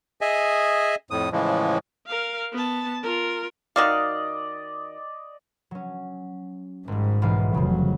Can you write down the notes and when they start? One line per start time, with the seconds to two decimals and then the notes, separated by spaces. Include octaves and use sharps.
0.21 G#4 D#5 E5 G#5
1.11 F2 A2 D#6
1.32 A2 C#3 E3 F3 G#3
2.06 A#4 F5
2.53 B3 A5
3.02 F4 A#4
3.76 D#3 F#4 D5 D#5 F5
5.71 F#3 C#4
6.88 G#1 G#2 G3
7.22 B1 E3 F5
7.54 F1 C#3 F3 F#3